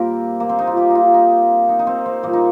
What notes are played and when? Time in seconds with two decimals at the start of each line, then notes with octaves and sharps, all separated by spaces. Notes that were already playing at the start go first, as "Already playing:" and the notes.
Already playing: A#2 G3 A#3 C4 F4 G4 A#4
0.40 A#3
0.49 C4
0.58 D#4
0.67 F4
0.77 G4
0.90 D#4
0.95 F4
1.14 D#4
1.69 D#4
1.79 D#4
1.87 C4
2.06 C4
2.23 A#2 G3 A#3
2.33 D#4